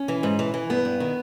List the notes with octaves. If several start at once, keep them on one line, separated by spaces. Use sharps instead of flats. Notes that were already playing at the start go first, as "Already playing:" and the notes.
Already playing: C#4
E3
G#2
E3
E3
G2 B3
G2
D#3